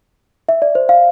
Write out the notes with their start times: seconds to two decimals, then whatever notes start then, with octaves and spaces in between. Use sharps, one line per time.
0.49 E5
0.62 D5
0.75 C5
0.89 F5